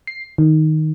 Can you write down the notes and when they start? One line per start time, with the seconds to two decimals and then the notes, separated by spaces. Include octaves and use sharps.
0.07 C7
0.38 D#3